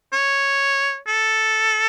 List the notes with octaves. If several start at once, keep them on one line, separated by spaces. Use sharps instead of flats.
C#5
A4